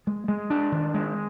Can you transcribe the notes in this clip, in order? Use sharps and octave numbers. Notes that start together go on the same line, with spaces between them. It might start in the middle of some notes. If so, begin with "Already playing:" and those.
G#3
G#3
D4
D#3
G#3